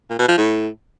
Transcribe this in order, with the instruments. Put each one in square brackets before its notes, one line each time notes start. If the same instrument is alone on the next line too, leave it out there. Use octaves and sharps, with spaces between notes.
[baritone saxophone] A#2
B2
F3
A2